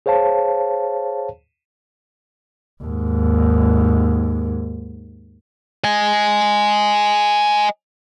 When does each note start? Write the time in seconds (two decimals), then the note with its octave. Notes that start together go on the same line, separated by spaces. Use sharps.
0.06 G#4 C5 C#5 F5 A5
2.83 D#2 G#2
5.84 D#5 G#5